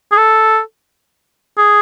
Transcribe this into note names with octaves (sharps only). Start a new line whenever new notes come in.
G#4
A4
G#4